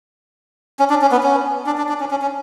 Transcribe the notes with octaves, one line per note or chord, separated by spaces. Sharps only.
C#4
D4
C#4
B3
C#4
D4
D4
D4
C#4
C#4
C#4